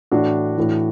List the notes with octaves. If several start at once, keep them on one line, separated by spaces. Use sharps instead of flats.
A2 E3 D4 F#4
A2 E3